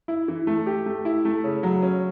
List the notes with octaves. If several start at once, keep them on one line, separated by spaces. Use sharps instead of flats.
E4
E3
A3
G4
A3
E4
A3
C#3
F#3
C#4